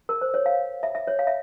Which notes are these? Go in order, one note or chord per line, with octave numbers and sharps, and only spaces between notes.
A#4
C5
C#5
F5
E5
E5
C#5
F5
E5